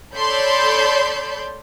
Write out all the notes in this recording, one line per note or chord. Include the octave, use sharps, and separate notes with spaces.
A4 C#5 D5 B5 C6 G6